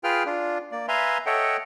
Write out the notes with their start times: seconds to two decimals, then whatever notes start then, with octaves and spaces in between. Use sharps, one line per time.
0.04 F4 G#4 B4 G5 F6
0.26 D4 F4
0.72 A#3 D5
0.88 B4 E5 F5 G#5 A#5 C6
1.26 A4 C#5 D#5 E5 F#5 G5